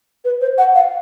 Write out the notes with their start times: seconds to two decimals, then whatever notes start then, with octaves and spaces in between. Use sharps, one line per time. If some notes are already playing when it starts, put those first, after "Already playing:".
0.24 B4
0.41 C5
0.58 F#5
0.75 F5